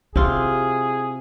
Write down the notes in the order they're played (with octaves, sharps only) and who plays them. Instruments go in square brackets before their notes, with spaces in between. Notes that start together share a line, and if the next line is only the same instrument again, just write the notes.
[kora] C3 F4 [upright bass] E4 [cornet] G#4